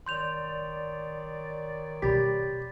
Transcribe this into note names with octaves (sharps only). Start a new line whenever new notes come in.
D#3 C#5 D5 C6 G6 F7
B2 G3 G4 B5 A6 B6